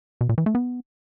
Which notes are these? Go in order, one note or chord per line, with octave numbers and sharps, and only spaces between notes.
B2
A#2
E3
A3
B3